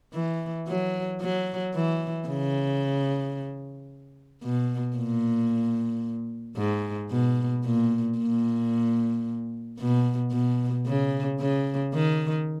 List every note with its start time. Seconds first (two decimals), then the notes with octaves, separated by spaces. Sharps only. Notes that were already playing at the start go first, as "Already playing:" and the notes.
0.14 E3
0.67 F#3
1.21 F#3
1.75 E3
2.28 C#3
4.43 B2
4.96 A#2
6.57 G#2
7.11 B2
7.65 A#2
8.18 A#2
9.80 B2
10.32 B2
10.86 C#3
11.40 C#3
11.94 D#3